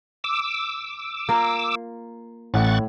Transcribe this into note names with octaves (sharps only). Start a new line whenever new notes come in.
D6 E6
A#3 F4 A#4
A1 A2 F#5 C#6 F#6 A6